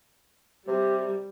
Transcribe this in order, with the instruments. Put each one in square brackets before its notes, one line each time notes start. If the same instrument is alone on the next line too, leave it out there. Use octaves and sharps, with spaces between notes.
[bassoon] C3 [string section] G3